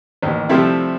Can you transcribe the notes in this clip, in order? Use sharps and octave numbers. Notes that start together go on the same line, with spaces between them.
A1 D#2
C3 F3 G3 A3 C4 E4